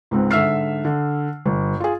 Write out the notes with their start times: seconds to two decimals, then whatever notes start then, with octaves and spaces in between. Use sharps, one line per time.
0.11 C#2 G#2 C4
0.31 G#2 D3 E5 E6 F6 C7
0.85 D3
1.46 G1
1.80 F4 G#4